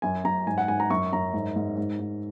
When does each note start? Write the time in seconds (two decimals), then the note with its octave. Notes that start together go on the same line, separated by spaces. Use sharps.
0.02 F#2 G#5
0.24 F#2 A#5
0.47 G#2 G#5
0.58 F#5
0.68 G#2 G#5
0.80 A#5
0.90 F#2 C#6
1.13 F#2 A#5
1.34 G#2
1.56 G#2
1.77 G#2
2.00 G#2